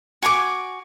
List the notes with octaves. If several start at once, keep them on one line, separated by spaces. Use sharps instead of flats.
F#4 G#5 A#5 D6